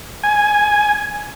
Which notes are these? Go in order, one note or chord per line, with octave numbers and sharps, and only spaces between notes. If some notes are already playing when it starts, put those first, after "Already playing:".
G#5